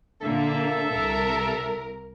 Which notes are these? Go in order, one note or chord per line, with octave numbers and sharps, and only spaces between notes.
A#2 D3 A#3 A4 E5
C2 A#4